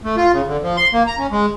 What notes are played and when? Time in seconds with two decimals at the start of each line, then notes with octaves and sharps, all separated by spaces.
0.04 A3
0.17 F4
0.33 C#3
0.48 D3
0.62 F3
0.77 C6
0.93 A#3
1.07 A#5
1.18 C#4
1.31 G#3